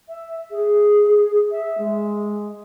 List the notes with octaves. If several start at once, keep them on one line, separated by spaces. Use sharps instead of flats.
E5
G#4
E5
G#3